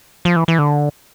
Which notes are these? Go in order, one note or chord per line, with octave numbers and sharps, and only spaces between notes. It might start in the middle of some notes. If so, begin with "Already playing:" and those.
F3
E3
E3
D3